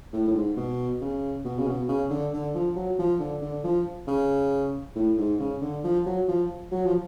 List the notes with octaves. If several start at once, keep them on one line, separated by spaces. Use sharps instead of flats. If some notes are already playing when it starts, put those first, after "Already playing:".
A2
A2
G#2
B2
C#3
B2
C#3
B2
C#3
D3
D3
F3
F#3
F3
D3
D3
F3
C#3
A2
G#2
C#3
D3
F3
F#3
F3
F#3
F3